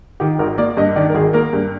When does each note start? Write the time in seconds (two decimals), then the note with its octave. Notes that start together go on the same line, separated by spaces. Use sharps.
0.20 D#3 G4
0.39 G#1 A#4
0.58 A#3 D5
0.77 G2 D#5
0.96 D#3 D5
1.10 A#4
1.14 G#1 G#4
1.33 A#3 A#4
1.53 G2